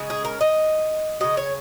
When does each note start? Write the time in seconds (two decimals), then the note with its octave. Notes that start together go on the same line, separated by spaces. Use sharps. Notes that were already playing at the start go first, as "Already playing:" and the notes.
Already playing: C#3 G#3
0.10 G#4
0.25 A#4
0.41 D#5
1.20 C#3 F#3 D#5
1.37 C#5